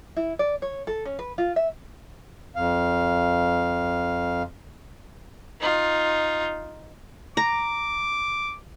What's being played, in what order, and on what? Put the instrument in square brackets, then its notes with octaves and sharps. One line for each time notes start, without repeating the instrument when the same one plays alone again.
[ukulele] E4
D5
C#5
A4
C#4
B4
F4
E5
[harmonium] F2 F5
[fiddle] D#4 F4
[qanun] A#5 [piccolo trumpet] D6